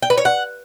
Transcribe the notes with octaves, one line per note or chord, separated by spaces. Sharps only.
G5
B4
C#5
F#5